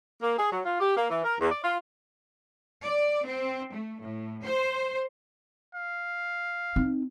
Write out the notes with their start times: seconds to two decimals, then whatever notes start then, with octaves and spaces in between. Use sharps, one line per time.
0.22 A#3
0.38 G#4
0.51 F#3
0.65 F4
0.80 G4
0.96 A#3
1.10 E3
1.24 A#4
1.39 E2
1.51 D5
1.63 F4
2.83 D5
3.26 C4
3.73 A3
4.02 A2
4.44 C5
5.74 F5
6.76 C4 D#4